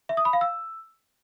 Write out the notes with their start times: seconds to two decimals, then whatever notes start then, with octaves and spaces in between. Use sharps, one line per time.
0.09 E5
0.17 D#6
0.25 B5
0.33 F5
0.41 E6